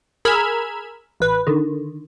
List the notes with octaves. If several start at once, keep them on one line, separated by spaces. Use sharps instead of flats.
G#4 A#4 B5 E6 F6 G#6
A1 B4
D3 D#3